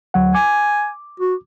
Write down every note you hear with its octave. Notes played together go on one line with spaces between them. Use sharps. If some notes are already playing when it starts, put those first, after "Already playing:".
D2 F#3 F#5
G#5 D6
F#4